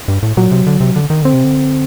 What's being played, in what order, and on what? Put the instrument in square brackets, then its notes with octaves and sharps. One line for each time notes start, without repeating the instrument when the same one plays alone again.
[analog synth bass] G2
A2
[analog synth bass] A#2 [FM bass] F#3
[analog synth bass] C3
D3
C3
D3
D#3
[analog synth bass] D3 [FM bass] C4
[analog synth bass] C3
D3